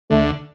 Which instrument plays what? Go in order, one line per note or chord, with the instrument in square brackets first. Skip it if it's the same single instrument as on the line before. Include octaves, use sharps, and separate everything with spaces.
[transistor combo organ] D2 D3 [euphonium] A3